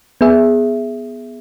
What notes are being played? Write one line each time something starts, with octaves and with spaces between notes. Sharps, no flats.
B3 G#4 E5